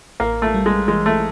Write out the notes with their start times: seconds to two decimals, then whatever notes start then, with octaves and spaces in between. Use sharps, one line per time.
0.20 A1 A#3
0.42 A3
0.54 G3
0.66 G#3
0.88 E3 G#3
1.06 A3